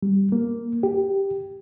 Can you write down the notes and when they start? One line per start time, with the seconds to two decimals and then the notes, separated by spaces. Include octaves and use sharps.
0.03 G3
0.32 A#3
0.83 G4